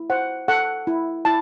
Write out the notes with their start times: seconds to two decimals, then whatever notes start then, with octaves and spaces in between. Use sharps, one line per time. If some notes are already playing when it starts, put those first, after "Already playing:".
Already playing: E4
0.10 C5 F#5
0.48 A4 F#5
0.87 E4
1.25 E4 A5